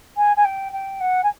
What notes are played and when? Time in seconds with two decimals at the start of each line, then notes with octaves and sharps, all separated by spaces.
0.17 G#5
0.36 G#5
0.44 G5
0.72 G5
1.00 F#5
1.23 G#5